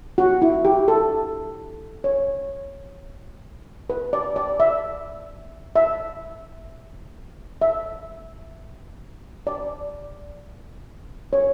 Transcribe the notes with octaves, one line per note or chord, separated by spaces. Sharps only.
F#4
E4
G4
A4
C#5
B4
D5
D5
E5
E5
E5
D5
C#5